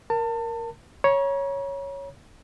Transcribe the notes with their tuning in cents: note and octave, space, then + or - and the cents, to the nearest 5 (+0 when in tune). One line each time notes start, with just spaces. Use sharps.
A#4 +0 A5 +30
C#5 +0 A#5 +45